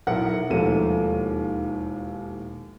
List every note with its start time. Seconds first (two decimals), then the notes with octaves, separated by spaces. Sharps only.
0.07 B1 E4 A#4 F#5 C#7
0.50 E1 D#2 F3 A3 A#3 D#7